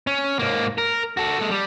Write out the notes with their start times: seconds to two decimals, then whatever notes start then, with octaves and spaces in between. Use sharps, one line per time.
0.07 C#4
0.39 G#2 A#3
0.78 A#4
1.17 F#4 A4
1.39 G#3 A4
1.51 G3